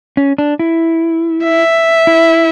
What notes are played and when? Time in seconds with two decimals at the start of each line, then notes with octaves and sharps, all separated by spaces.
0.17 C#4
0.38 D4
0.59 E4
1.44 E5
2.07 E4